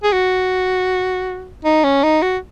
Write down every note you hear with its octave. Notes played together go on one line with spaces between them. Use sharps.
G#4
F#4
D#4
C#4
D#4
F#4